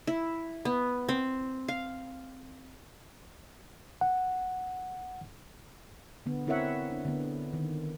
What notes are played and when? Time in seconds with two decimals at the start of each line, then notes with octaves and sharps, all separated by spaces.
0.07 E4
0.65 B3
1.09 C4
1.68 F5
4.01 F#5
6.26 D3 B3
6.47 C4 E4 A#4 C#5 E5 F#5
6.91 D4
7.05 D3 B3
7.53 D#3